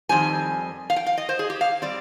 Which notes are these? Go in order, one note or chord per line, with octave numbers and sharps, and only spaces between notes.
F2 D#3 G3 C4 G#5
F5
G5
F5
D#5
C5
G#4
G4
F5
G3 C4 D5